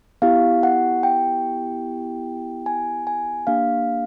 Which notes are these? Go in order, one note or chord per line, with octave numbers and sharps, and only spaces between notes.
B3 E4 G4 F5
F#5
G5
G#5
G#5
A#3 D4 G4 F5